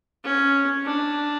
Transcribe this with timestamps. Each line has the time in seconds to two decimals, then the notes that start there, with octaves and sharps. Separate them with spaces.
0.24 C#4
0.85 D4